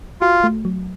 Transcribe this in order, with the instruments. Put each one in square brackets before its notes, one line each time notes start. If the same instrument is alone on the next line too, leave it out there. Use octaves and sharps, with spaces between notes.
[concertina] F4 [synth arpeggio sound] F#4
[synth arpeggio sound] A3
F#3